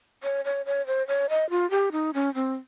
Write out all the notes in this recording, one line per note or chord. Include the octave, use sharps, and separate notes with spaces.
C#5
C#5
C#5
C5
C#5
D#5
F4
G4
D#4
C#4
C4